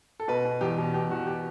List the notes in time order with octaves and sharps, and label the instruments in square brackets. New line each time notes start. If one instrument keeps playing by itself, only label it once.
[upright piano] A4
B2 B4
B2
E2 G4
B2
B2 G4
E2 F#4
G4